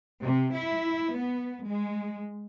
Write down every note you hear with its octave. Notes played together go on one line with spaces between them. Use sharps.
C3
E4
B3
G#3